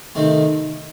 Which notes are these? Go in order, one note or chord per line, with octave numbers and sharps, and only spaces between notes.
C3 D#3 A3 C4